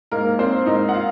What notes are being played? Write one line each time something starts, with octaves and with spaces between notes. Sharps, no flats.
G#2 A#3 A#4
A#3 C4 C5
G#2 D#4 D#5
F#5
F4 F5